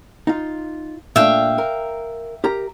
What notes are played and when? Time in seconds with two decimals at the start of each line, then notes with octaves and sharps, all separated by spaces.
0.27 D#4 F4
1.16 A#2 A3 D4 E5 F5 G5
1.58 A#4
2.44 G4 A#4 A#5